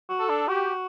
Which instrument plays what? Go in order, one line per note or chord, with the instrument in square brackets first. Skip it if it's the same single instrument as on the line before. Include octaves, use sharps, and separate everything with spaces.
[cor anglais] F#4
[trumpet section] A4
[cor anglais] D4
[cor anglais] F#4 [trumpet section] G4